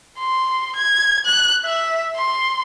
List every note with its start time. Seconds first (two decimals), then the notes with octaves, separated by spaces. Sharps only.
0.18 C6
0.76 G#6
1.25 F#6
1.65 E5
2.17 C6